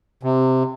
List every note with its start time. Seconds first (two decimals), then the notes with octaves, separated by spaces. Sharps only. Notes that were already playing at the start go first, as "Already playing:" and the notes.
0.23 C3